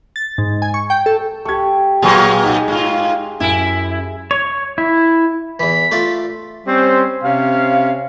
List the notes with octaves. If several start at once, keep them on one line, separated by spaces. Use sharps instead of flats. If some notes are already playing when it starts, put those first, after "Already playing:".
A6
G#2
G#5
C#6
G5
A4
A3 G4 C#6 G#6
A#2 F#3 G#3 A#3 G5 G#5 C6 C#6
D#4 G#4 E5
G#2 F4
F#2 E4 G#5 D7
C#5
E4
E2 E3 B6
A3 F4 D5
G3 C4 C#4 C5
C3 C#4 F5